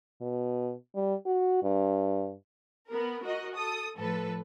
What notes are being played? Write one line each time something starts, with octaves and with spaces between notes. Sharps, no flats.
B2
G3
F#4
G2
B3 A#4
F#4 A#4 D#5
A4 D#6
A2 F3 A4 B4